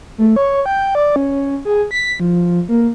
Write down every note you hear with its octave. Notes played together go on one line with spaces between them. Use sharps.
A3
C#5
G5
D5
C#4
G#4
B6
F3
A#3